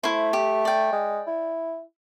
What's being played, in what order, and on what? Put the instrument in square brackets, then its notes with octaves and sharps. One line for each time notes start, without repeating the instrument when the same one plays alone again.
[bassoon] A3 [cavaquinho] E4 C5
[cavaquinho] G4
D5 G5
[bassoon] G#3
E4